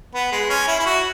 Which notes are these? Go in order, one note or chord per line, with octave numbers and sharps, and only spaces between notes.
B3
G#3
C#4
E4
E4
F#4